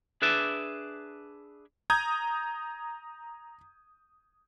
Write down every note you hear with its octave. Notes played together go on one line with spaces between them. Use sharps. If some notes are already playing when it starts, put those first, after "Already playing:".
D4 G#4 B4 D5 E5
A#5 D#6 G6 G#6